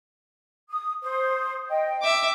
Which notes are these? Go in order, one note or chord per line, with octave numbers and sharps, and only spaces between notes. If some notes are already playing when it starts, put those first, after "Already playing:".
D#6
C5 D#6
D#5 G5
E5 D6